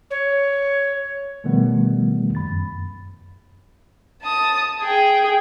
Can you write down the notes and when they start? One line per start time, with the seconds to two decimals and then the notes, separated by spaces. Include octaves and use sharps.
0.10 C#5
1.44 B2 D#3 F3 G3 A3 B3
2.35 F#2 B5 A6
4.22 A5 D#6
4.82 G#4 G5